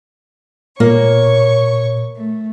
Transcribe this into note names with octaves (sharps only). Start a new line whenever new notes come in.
A#2 A#3 C#5 C#6
A3